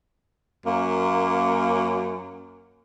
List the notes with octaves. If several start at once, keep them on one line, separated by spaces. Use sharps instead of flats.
F#2 A#3